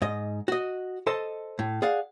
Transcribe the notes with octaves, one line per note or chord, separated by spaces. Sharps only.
G#2 D#5
F#4 D#5
A4 C5 D#5 A5
A2
G#4 D5 F5 F#5